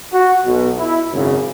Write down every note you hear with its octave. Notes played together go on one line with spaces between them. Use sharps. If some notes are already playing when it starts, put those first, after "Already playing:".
F#4
B1 B2
E4
G#1 F#2 C#3